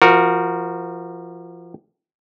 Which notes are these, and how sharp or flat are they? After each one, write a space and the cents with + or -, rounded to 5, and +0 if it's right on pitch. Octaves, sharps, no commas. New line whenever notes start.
F3 -25 F#4 -15 A#4 +0